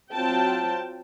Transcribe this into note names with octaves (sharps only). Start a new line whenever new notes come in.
F#3 C4 F4 G5 A5